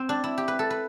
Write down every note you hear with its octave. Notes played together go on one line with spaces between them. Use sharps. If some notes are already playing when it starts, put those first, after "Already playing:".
Already playing: C4
D4
E4
G4
B4
A4
B4